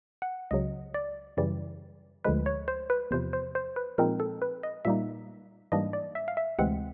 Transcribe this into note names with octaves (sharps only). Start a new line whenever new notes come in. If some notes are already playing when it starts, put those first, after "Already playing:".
F#5
C#2 C#3 F#3 D#5
D5
F#2 C#3 E3 G3 D5
D2 D3 F3 G#3 B4
C#5
C5
B4
E2 C3 F3 C5
C5
C5
B4
A#2 F3 G#3 C4 D#4 A#4
A4
B4
D#5
A#2 G3 A#3 D#4 E5
G#2 E3 G3 A#3 D4 D#5
D5
E5
F5
E5
D2 C3 E3 G#3 C4 F#5